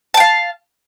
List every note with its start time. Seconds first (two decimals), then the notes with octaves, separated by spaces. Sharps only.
0.14 A5
0.17 G5
0.20 F5